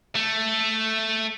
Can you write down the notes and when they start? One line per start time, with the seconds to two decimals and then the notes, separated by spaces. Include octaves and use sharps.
0.16 A3